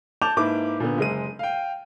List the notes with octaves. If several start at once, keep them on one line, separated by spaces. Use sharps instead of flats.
A5 D6 G6 F7
G#2 A#3 E4 B4 D6
A#2 D3 B3
F#1 G#3 D#7
F5 G5